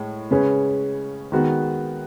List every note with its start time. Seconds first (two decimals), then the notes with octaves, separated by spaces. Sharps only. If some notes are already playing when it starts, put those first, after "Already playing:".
Already playing: A2 G#3
0.31 C#3 G#3 C#4 G#4 B4
1.32 D#3 G#3 B3 F#4